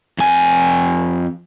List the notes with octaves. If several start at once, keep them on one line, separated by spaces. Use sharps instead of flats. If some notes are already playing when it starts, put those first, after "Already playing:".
F2 G#5